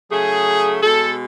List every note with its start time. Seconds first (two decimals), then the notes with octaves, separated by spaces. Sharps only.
0.10 C#3 F#3 A3 G#4
0.81 B2 G#3 A4